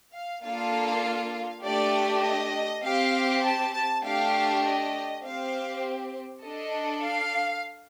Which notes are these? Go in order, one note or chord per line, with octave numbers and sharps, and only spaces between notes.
F5
A#3 D4 F4 A4 F5
A3 D4 G4 D5
D#5
C4 G4 F5
A5
A5
A3 D4 G4 F5
D#5
C4 G4 F5
D4 A4 D#5
F5